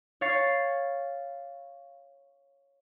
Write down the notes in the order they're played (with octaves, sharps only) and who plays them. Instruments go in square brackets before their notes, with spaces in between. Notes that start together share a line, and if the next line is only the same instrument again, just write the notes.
[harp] C#5 F5 A6 C7